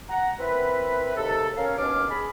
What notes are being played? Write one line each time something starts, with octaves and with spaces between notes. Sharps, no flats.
F#5 A#5
C4 E4 A#4 B4
D#2 G#2 C3 A4
C#4 A#4 C#5 F5
D#2 B2 C#4 D4 D6 F6
G#4 B5